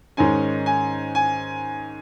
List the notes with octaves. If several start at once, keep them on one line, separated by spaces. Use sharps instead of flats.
G#2 D#3 G#3 C#4 G#5
G#5
G#5